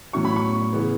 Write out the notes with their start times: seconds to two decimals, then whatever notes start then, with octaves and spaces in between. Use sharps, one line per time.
0.13 A2 F#3 C#4 E4 C#6
0.25 B5
0.36 C#6
0.73 C#3 E3 B3